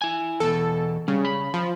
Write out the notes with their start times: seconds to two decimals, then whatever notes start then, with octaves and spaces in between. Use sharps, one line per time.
0.02 E4 G#5
0.40 E2 B2 A4
1.08 C#3 G3
1.25 B5
1.54 F3